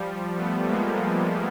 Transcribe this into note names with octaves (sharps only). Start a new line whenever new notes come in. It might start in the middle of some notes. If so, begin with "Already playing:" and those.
Already playing: F3 G3
A3 B3
G#3 A#3